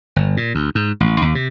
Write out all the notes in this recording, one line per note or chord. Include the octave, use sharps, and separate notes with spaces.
G1
A#2
D2
G#2
A1
D#2
C3